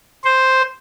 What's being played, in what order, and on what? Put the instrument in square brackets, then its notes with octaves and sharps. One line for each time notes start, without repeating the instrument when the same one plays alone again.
[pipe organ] C5